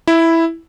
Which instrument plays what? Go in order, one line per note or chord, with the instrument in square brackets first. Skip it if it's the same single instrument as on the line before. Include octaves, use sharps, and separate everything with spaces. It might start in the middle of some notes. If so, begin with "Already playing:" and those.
[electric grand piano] E4